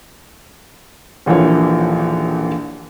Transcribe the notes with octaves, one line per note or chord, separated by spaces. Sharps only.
D#1 A#1 E3 F3 A#3 C#5